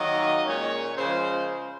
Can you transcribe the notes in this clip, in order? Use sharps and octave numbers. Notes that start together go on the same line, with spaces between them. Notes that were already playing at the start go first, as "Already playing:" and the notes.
Already playing: D#3 F#3 A#3 D#5
A#2 G#3 C#4 C#5
C#3 F3 G#3 C5